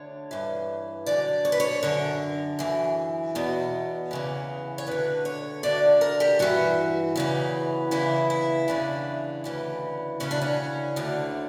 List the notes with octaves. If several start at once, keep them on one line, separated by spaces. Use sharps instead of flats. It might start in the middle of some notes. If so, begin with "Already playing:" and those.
Already playing: D2 D3 C#5
G2 E3
F#2 D3 D5
C#5
B4
C#5
F#2 D3 A#4
F#2 E3
E2 B2
E2 C#3 E3
C#5
D2 D3 B4
C#5
D2 D3 D5
A#4
G4
G2 E3 F#4
E2 C#3 E3
E2 C#3 E3 E4
E4
E2 C#3 E3 D4
D2 C#3 E3
D2 C#3 E3 C#4
D4
C#4
D2 D3